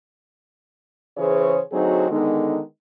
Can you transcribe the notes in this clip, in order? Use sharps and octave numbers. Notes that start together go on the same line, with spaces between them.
C#3 E3 G#4 C5 C#5
D2 F#3 C4 D#4 F#4 G#4
D3 D#3 G#3 B3 D#4